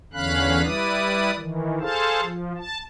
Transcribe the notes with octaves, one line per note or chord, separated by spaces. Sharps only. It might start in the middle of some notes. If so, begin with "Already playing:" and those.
E2 D3 C#4 F5 B5 F#6
G3 E4 B4 D5 D#6
D#3 E3
G#4 A4 C5 F5 A5
F3
A5